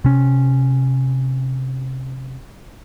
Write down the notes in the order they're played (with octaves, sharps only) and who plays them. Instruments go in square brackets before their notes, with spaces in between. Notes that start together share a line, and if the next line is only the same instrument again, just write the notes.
[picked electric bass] C3 C#4